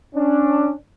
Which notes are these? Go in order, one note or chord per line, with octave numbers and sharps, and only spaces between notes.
C#4 D4